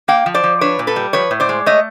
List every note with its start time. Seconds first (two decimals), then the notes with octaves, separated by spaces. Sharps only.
0.08 A#3 F5 G5
0.26 F3
0.34 C5 D5
0.44 F3
0.61 D4 B4 C#5
0.79 A#2
0.87 A4 B4
0.96 G3
1.13 F3 B4 C#5
1.31 A2
1.40 C5 D5
1.49 G#3
1.66 A3 C#5 D#5